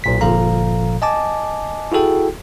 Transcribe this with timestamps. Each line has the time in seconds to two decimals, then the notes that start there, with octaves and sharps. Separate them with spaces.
0.04 B1 A#2 B6
0.21 G1 A#2 F3 A4 F5 A#5
1.02 D#5 G#5 A5 D6
1.92 E4 F#4 G#4 A4 G5